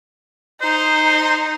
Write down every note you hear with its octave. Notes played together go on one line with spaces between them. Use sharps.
D#4 C5